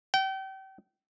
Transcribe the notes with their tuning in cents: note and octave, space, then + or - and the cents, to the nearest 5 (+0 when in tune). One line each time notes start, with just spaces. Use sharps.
G5 -35